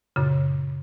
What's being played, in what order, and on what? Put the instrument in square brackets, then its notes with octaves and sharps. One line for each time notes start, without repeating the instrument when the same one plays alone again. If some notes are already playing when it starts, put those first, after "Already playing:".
[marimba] F#2 A#2 C#3